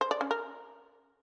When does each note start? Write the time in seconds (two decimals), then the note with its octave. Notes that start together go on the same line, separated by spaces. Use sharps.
0.01 C5
0.11 D5
0.21 C#4
0.31 A#4